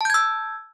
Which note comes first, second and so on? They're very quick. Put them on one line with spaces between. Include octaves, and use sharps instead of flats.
A5 G6 G#6 E6